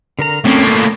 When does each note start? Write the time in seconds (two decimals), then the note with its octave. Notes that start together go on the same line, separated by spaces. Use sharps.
0.19 D3 A#4 A#5
0.45 A2 A#3 C4 C#4
0.67 C6 G6